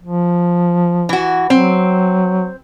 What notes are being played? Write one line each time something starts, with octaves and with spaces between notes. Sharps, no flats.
F3
E3 F#4
F#3 C4